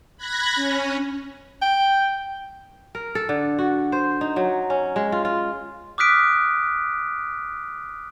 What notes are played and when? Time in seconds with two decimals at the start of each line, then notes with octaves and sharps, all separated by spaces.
0.18 B5 F#6 G#6 A#6
0.55 C#4
1.62 G5
2.95 A#4
3.15 A4
3.29 D3
3.59 F#4
3.92 C5
4.21 D#4
4.36 F#3
4.70 C#4
4.96 G#3
5.12 F4
5.25 F4
5.98 D6 D#6 F6 F#6 B6 D7